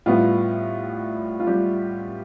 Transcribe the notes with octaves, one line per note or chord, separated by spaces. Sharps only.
A2 G3 B3 F4
F4
G3 G4